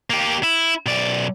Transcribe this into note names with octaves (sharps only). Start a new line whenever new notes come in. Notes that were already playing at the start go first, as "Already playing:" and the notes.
A#3 G4
E4
B1 D5